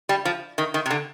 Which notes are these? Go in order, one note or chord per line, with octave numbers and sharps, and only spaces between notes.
G3
F3
D#3
D#3
C3
D3